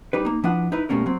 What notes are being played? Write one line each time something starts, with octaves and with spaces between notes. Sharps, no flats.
G3 D#4 B4
A#3 D#4
F3 D4 E4 B4 F#5
D#4 E4 B4
B2 G3 A3 A#3 C#4 A#4
F#3 C4